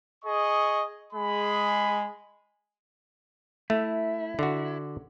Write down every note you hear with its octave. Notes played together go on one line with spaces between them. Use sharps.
G#4 D#5 C#6
G#3 G#4 B5
A3 E4
D3 F#4